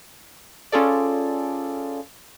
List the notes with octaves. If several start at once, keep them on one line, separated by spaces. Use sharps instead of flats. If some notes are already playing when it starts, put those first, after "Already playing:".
C#4 F4 G#4 A4 D5